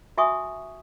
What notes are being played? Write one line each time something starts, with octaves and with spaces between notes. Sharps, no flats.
F#4 E5 G#5 C#6 D#6